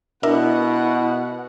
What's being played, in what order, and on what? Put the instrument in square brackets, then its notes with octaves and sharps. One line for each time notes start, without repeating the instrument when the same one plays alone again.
[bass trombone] B2 [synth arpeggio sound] D4 A#4 E5 [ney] E4 [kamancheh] F#5